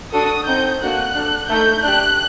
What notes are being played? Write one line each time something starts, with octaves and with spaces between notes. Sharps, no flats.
D4 F#4 A4 D#6
C4 D#4 A4 G6
A#3 D4 F#4 A4 F#6
D4 A4
A3 D#4 A4 G6
D4 G4 F#6